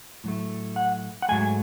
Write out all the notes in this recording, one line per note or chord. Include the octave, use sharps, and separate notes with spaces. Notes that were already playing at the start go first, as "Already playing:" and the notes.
A2 F#3 A3
F#5
F#5
G#2 F#3 A3 G#5